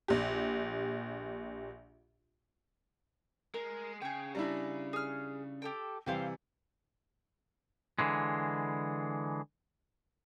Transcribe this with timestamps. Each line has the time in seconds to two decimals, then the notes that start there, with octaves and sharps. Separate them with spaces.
0.08 A#1 G4
3.54 G#3 A#4
4.02 C#3 G#4 G5
4.35 G3 D4 E4 A#5
4.93 G#4 F6
5.62 G4 A4 G5
6.06 C3 E3 G3 C5 F5 G5
7.99 D3 E3 G#3